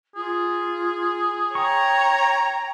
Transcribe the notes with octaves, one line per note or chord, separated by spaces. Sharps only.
F4 G#4
C#5 G5 A#5 C#6